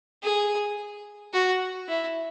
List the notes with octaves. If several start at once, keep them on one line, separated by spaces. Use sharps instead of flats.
G#4
F#4
E4